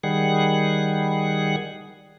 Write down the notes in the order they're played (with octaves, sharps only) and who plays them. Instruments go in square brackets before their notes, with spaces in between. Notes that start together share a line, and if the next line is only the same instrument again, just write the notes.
[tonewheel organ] D#3 G3 G#4 F#5